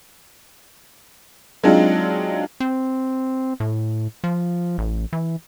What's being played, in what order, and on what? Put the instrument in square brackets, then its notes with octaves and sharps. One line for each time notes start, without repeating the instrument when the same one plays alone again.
[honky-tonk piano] F#3 G#3 C4 D4 D#4 F4
[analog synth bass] C4
A2
F3
A1
E3